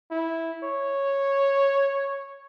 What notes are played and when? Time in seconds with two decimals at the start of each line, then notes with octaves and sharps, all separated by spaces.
0.11 E4
0.63 C#5